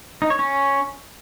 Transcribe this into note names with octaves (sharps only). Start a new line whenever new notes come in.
D#4
C#5
C#4